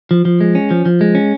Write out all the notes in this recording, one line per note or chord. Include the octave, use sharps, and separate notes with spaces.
F3
F3
G#3
C#4
F3
F3
G#3
C#4